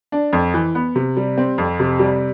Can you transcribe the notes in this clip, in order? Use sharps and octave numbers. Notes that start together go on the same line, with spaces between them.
D4
F2
E3
B3
C3
G3
C4
F2
C3
G3